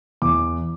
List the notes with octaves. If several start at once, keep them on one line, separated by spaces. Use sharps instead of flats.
E2 D6